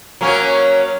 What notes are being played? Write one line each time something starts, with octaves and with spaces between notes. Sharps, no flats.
F#3 A#3 C#4